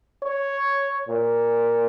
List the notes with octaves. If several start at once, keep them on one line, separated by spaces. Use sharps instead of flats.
C#5
A#2